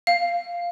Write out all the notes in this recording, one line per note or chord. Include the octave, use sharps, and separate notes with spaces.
F5